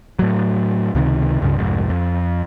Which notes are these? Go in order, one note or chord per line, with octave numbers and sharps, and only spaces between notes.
A2 F#3
C#2 C3 D#3
C#2 G2 C#3
C2 F2 G#2
F2